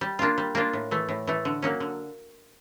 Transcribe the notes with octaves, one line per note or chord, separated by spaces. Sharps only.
G3
A#3 D4 F4
G3
A#3 D4 F4
A2
E3 A3
A2
E3 A3
D3
F#3 A#3 C#4
D3